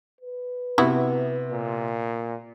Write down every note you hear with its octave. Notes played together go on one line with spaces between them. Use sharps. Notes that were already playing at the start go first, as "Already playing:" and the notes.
B4
C3 B3 E4 F#4
A#2